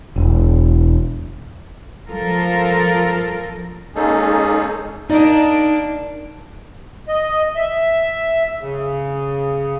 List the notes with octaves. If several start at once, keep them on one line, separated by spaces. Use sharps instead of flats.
E1
F3 F4 A4 A#4
G#3 A#3 C#4 D#4 G#4 A4
A#3 D4 D#4 D5 D#5
D#5
E5
C#3